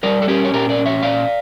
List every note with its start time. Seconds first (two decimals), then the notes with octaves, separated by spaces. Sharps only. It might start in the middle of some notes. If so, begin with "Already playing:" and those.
0.03 G3 A#4 D5
0.22 A4
0.28 C#4 G4 A#4
0.45 C#5
0.53 A#2 G4 A#4
0.69 A#4 D5
0.78 C#4
0.86 C#5 E5
1.02 A#2 D5 F5